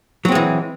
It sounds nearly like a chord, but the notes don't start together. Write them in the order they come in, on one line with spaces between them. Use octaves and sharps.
F#3 C4 G#3 E3